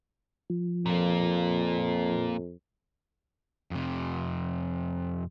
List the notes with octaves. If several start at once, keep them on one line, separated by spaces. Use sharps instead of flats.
F3
F2 A#2 A#3
F2 C3